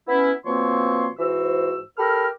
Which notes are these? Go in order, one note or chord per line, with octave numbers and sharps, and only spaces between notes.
B3 C#4 E4
B2 F3 A#3 C4 C#5 C6
G#2 E3 F#4 C5 E6
G4 A4 A#4 B5 F6